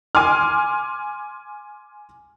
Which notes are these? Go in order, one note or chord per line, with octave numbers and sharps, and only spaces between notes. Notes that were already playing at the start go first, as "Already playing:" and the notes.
G#5 C6 D6 F6